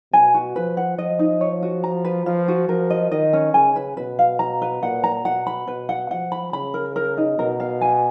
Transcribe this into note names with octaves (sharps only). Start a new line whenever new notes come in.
B2 G#5
F#4
F3 B4
F#5
F3 D#5
D#4
C#5
F#4
A#5
B4
F3 F5
F#4
F3 A#4
D#5
D#3 D#5
C#4
C#3 G#5
B4
B2 B4
F5
A#5
B4
A#2 F#5
A#5
B2 F#5
B5
B2 B4
F#5
F3 F#5
B5
C#3 B5
A#4
A#4
D#4
B2 A#4
F5
G#5